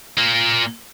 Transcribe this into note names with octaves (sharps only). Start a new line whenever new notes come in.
A#2 A#3